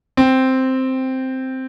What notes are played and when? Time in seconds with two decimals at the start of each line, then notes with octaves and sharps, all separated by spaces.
0.17 C4